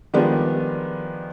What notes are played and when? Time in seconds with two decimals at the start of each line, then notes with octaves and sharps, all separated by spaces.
0.14 D#3 F3 G3 G#3 B3 D4